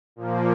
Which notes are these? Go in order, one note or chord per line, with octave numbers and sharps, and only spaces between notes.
A#2 F3 A#3